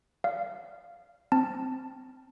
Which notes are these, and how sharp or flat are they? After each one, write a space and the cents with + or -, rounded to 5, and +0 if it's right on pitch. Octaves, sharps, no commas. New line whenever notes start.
D5 +0 F5 -15
C4 +0 A5 +10